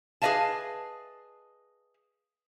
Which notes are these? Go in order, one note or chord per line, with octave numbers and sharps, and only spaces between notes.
G#4 B4 D5 D#5 F5 A5